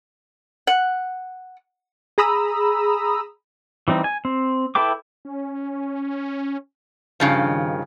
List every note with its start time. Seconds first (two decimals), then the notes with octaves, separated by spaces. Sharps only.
0.67 F#5
2.18 G#4 A#5 B5 D#6 E6
3.88 E3 G3 C4 D#4
4.04 G#5
4.25 C4
4.75 E4 A4 B4 G5 D6
5.25 C#4
7.20 G2 C#3 F3 D#4
7.34 D#3